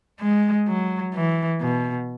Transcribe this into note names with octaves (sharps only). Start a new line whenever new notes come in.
G#3
F#3
E3
B2